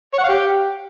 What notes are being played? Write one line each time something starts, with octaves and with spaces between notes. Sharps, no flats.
C#5
F#5
F5
G4